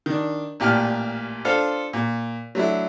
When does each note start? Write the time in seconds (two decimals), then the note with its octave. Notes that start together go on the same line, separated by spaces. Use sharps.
0.06 D#3 D4
0.60 A1 A#2 G4 D5 F6
1.45 D4 F4 A4 C5 F5
1.93 A#2
2.55 F#3 A3 D4 E4